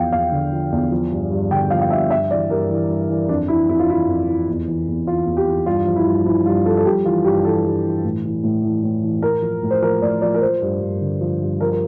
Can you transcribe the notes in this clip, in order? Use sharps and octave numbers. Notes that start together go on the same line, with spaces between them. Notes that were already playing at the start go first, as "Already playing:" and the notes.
Already playing: E2 F3 F5 G5
E2 F5
D3
F3
E2
F3
G2
G2
D3 G5
F3 F5
F5
G2 E5
G2 E5
E3 D5
G2 A#4
E3
G2
E3
F2 D4
E3 E4
F2 E4
F4
E3 E4
F2
E3
E2
E3
E2
E3 F4
E2
G4
E3
G2 F4
F3
E4
G2
F3 E4
G2 F4
F3 A4
A4
G2 G4
E3 F4
G2 G4
E3 A4
G2
E3
A2
E3
A2
E3
A2
E3
A2 A#4
F3
A2
C5
F3 A#4
A2 D5
F3 D5
A#4
F3 C5
G2
G2
D3
F3
G2
F3 A#4
A#4